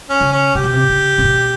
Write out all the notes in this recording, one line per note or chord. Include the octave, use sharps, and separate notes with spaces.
C#4
C#3
C#4
C3 G4
B2
C3
C#3
C3
B2